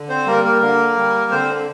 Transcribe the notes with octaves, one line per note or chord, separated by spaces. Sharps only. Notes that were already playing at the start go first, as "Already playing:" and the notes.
Already playing: D3
C4 C5
G3 A#3 A#4
A#3 A#4
D3 A#3 A#4
G3
D3 C4 C5